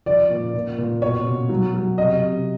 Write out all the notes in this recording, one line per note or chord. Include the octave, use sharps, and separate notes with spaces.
F3 D5
A#2
A#2
A#2
B2 C#5
B2
F#3
F#3
C3 D#5
C3